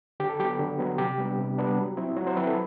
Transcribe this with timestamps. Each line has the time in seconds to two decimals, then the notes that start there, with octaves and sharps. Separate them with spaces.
0.20 D3 G4
0.29 A4
0.39 F#3 B3 G4
0.59 D3
0.79 F#3 B3
0.98 C3 G4
1.18 G3 B3 D4
1.38 C3
1.58 G3 B3 D4
1.77 F#3
1.97 C4 E4
2.16 F#3 F#4
2.27 C5
2.36 C4 E4 B4
2.46 A4